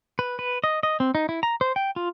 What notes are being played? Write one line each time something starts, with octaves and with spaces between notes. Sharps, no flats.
B4
B4
D#5
D#5
C4
D#4
E4
A#5
C5
G5
F4